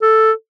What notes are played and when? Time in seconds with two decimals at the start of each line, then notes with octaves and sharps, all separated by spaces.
0.02 A4